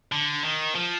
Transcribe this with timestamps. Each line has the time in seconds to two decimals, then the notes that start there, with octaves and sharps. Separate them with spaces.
0.12 D3
0.44 D#3
0.75 F3